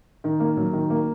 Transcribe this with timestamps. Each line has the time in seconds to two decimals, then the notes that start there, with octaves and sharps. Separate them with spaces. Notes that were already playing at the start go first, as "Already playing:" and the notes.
0.24 D#3
0.40 A#3
0.57 F#3
0.73 D#3
0.90 A#3